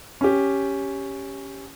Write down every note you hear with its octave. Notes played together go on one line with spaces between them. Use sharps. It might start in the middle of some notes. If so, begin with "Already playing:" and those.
C#4 G4